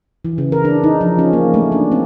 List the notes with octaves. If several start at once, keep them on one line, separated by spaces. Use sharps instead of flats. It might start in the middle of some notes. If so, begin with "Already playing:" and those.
E3
C#3
A#4
D4
D#4
F3
C#4
A#3
A3
D4
C4